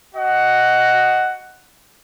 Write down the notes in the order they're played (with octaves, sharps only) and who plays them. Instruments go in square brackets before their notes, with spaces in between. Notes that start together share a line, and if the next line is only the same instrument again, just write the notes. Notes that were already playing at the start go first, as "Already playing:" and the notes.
[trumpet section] F#4 D#5 F#5